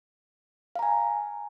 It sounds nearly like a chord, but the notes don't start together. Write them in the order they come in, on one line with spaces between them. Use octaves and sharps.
F5 A#5 G#5